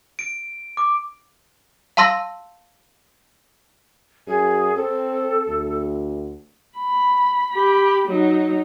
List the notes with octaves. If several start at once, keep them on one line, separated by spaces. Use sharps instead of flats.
D7
D6
F5 A5 C6 E6 A#6
F#2 G#4
C4 A4
D2
B5
G4 B5
F#3 D#4